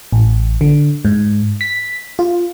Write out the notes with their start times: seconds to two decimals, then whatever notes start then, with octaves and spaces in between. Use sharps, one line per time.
0.12 A1
0.61 D3
1.05 G#2
1.61 B6
2.19 F4